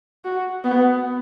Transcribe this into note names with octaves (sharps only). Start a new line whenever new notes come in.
F#4
B3